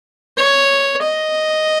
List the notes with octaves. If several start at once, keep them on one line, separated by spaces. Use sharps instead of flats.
C#5
D#5